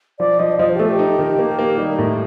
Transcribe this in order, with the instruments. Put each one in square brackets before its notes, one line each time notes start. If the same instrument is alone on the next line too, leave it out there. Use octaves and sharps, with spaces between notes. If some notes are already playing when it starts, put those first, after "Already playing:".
[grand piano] F3 [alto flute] D5
[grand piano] F3 [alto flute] D#5
[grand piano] F3 [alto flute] D#5
[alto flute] C5
G4
[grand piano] A3 [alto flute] A4
[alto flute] G4
[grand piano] D#4
D#3
A#3
A#3
[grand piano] G3 [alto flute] D#4
[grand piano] A2